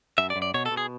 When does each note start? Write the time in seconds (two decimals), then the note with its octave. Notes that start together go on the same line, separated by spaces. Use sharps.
0.18 F#2 E5
0.30 D5
0.36 F#2
0.42 D5
0.54 B2 C#5
0.66 A4
0.71 B2
0.77 G#4